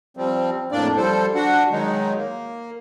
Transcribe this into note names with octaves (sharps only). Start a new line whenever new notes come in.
F3 G3 C4
F2 A2 A#3 D4 D5
F3 G3 A4 C5
D4 F#4 F#5
D#3 F#3 G#3 D#4
A#3